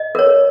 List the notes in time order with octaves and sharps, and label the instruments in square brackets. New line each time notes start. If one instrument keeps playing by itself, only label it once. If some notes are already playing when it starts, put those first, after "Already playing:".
Already playing: [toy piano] D#5
A#4 C#5